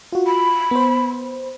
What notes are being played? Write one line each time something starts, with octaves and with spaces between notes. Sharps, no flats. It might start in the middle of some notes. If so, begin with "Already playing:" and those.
F4 F#4
B5
B3 C5